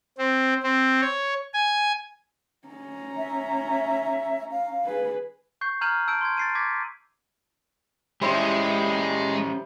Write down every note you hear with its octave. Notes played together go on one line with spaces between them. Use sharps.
C4
C4
C#5
G#5
C#4 A#5
E5
F5
G#4 B4
C#6 G6 C7
A#5 F6 G6 G#6 D#7 F#7
A5 E6 G6 D7
C6 G#6
A6 C7 D#7
D6 G#6 A6 B6
G3 G#3 C#4 E4 G4 C5